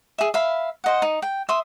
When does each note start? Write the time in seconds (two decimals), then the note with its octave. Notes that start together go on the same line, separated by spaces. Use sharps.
0.18 G#4 E5
0.34 E5 F5 B5
0.84 C5 D#5 F#5
1.02 D#4 D#6
1.22 G5
1.49 E5 C6 D#6